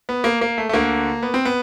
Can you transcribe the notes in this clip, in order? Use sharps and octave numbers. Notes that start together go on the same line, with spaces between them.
B3
A#3
A#3
A3
A3
D2 D3 A#3
B3
C4
B3